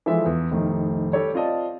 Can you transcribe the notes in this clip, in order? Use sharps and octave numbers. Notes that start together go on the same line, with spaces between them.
E3 F3 G#3 A4 E5
E2
F1 A2 D#3
G3 G4 A4 C#5
C4 F4 D5 D#5 A5